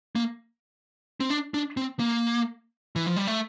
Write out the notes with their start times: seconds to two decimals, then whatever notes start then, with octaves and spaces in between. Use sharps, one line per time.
0.15 A#3
1.20 C4
1.30 D4
1.54 D4
1.77 C4
1.99 A#3
2.96 E3
3.06 F3
3.16 G3
3.27 A3